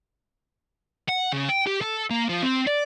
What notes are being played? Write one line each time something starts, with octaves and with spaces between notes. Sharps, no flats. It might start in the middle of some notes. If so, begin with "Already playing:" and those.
F#5
C#3
G5
G4
A4
A#3
F3
C4
D5